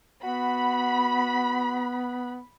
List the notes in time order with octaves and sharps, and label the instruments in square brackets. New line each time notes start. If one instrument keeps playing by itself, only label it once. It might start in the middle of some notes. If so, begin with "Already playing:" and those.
[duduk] B3 [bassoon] F#4 [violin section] B5